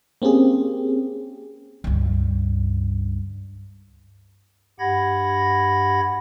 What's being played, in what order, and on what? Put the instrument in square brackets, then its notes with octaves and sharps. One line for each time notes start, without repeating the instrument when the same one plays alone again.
[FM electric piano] A#3 C4 C#4 G4 G#4
[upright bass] C#2 G2
[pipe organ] G2 G4 F#5 B5 G#6 A#6